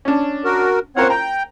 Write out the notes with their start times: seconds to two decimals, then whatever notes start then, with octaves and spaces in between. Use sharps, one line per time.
0.05 C#4 D4
0.45 F#4 A#4
0.97 C4 F4 A#4 C5 C#5 F#5
1.10 G5 A#5